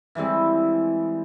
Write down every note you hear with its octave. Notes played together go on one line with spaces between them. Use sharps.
E3 G3 G#3 C4